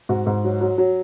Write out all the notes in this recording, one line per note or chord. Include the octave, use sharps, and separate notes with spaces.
G#2 F#4
G#2
F#3
F#3
F#3